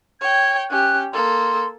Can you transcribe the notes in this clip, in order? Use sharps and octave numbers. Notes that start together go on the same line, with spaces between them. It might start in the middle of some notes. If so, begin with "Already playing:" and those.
C#5 G5 G#6
C#4 G4 F#6
A#3 A4 C6